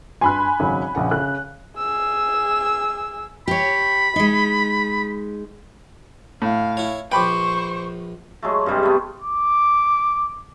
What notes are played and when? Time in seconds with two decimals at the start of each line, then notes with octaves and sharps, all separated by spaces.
0.21 G2 G#5 B5 C6 F#6
0.60 G#1 C#3 F#3
0.95 A#1 C#3 F#5
1.11 C#3 F#6
1.78 G#4 E6
3.48 G4 C#5 B5
4.16 G#3 D#4
6.42 A2 F5
6.77 E4 C#5
7.12 A#1 B4 C5 G5 B5 C#6 D6
8.42 F#3 G#3 A3
8.66 G2 C3 G3 G#3
8.83 A3 B3
9.20 D6